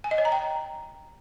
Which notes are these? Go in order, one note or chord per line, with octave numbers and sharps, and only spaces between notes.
G#5
D#5
C#5
A#5
G5